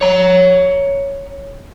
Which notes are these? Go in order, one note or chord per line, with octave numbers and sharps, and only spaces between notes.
C#5 A#5